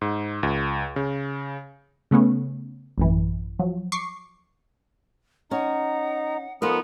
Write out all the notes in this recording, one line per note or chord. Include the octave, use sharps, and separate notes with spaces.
G#2
C#2
C#3
C#3 A3 B3 C#4
A1 F#2 E3
F3 F#3
C#6 D6 C7
C#4 D#4 F#5 A#5
F3 B3 D#4 F4 A4 A#4 D#6